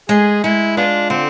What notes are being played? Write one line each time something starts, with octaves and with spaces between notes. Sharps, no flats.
G#3 G#4
G#3 E4
B3 D4 F4
D3 C4